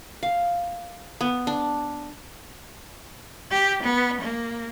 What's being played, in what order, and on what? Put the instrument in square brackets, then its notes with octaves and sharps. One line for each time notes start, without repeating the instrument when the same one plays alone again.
[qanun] F5
B3
D4
[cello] G4
B3
A#3